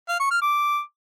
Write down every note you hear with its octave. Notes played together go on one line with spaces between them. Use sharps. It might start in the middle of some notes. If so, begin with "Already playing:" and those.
F5
C#6
F6
D6